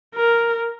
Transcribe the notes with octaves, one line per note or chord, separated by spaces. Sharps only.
A#4